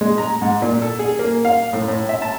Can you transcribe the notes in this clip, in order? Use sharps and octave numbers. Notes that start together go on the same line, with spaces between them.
G#3
A#5
G#2
A#2
A4
G#4
A#3
F5
A2
A2
E5
A5